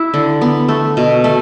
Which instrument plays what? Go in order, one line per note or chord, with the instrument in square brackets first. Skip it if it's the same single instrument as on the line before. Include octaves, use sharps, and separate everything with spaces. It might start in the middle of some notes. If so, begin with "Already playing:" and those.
Already playing: [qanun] E4
D3
B3
A3
B2
A3